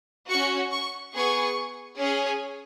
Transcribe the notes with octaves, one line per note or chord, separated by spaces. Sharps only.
C#4 F#4 C#6
C#6
B3 G#4 C#6
C#4 G#4